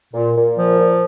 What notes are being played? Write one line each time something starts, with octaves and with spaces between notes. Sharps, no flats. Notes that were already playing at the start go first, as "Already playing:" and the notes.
A#2
A#2
F3
A#2